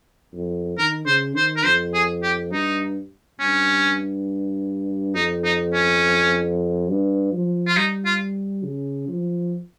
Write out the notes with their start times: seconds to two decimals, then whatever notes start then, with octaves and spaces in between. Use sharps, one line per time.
0.34 F2
0.78 D#3 A#4
1.07 C#3 C5
1.35 D#3 C5
1.56 A#4
1.65 F2 C5
1.94 G#4
2.23 G4
2.52 G2 D#4
3.40 G2 C#4
5.15 F2 D#4
5.44 D#4
5.73 C#4
6.90 G2
7.33 F3
7.67 F4
7.76 G3 D#4
8.05 F4
8.63 C#3
9.08 F3